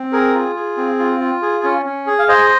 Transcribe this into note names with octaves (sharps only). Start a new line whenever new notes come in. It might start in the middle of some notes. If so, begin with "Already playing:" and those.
Already playing: C4
G#4 A#4
F4
G#4
C4
F4
F4
G#4
C#4
C#4
G#4
F5
G#4 C5 D#5